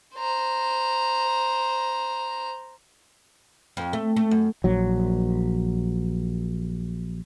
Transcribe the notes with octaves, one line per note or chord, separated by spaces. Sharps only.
C5 A#5
F2
A3
A3
F#2
A#1 F#3